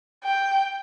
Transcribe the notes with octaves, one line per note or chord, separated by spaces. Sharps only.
G5